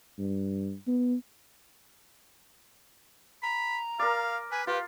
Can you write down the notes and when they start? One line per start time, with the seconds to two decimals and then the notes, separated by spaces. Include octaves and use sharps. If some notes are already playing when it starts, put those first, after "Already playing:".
0.19 G2
0.87 B3
3.43 A#5 B5
3.99 A#4 D5 F5
4.52 B4 G#5
4.67 F4 G4 B4